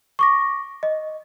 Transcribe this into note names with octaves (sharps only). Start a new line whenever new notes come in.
C#6 D6 A#6
D#5